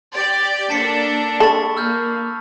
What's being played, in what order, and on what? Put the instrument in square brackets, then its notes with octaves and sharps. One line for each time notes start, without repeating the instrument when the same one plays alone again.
[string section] G4 D5
[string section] A#3 D4 A4 [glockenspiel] A5 B6 C#7
[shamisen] A4 [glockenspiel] B5 C#6 A6
[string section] A#3 [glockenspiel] E6 F6 G6